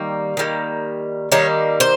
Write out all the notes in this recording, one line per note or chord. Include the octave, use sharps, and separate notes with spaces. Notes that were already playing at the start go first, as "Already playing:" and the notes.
Already playing: D#3 G3 A#3
D#3 G3 A#3
D#3 G3 A#3 C#5
C5